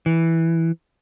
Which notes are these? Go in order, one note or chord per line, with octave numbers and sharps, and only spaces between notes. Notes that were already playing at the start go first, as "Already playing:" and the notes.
E3